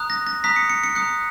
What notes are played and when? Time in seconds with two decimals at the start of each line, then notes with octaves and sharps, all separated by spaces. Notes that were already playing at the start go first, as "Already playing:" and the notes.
Already playing: A#5 D#6 F#6
0.10 A#6
0.27 A#6
0.44 A#5 D#6 F#6 B6
0.56 C#7
0.70 C#7
0.83 C#7
0.95 A#5 D#6 F#6 C#7